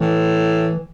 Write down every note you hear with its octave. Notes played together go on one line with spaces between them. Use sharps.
A2 E3